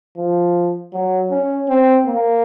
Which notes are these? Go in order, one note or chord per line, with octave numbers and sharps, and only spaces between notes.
F3
F#3
C#4
C4
A#3